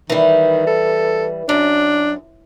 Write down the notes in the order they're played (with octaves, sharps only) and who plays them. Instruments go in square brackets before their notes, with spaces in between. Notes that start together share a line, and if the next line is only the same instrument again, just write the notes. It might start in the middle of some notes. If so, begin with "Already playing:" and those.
[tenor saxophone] D#3 [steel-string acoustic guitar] E3 G3
[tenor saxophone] A4
[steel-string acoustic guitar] F#2 [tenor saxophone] D4